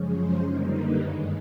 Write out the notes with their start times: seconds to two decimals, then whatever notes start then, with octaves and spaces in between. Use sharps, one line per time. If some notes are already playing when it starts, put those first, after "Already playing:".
Already playing: F#2 C#3 F3 G#3 C#4
0.12 C5
0.41 F#2 D3 G3 A#3 D#4
0.69 B4
0.98 G2 D#3 G#3 C#5